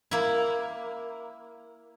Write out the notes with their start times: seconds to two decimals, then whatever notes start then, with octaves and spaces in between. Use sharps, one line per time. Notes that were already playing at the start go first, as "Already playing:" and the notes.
0.11 A#3 E4